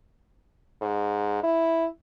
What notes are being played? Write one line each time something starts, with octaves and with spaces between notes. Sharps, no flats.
G#2
E4